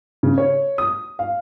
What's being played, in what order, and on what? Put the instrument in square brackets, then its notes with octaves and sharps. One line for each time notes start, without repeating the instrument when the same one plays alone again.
[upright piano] C#3
C#5
D#6
F5